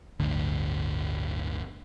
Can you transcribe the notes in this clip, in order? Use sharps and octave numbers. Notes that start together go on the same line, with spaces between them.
G1 D2 A2 D3